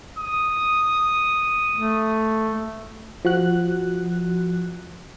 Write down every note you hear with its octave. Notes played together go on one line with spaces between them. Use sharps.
D#6
A3
F3 F#4 F#6